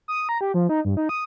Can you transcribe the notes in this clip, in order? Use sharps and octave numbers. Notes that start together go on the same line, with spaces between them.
D#6
A#5
G4
F3
D#4
G2
D#4
D#6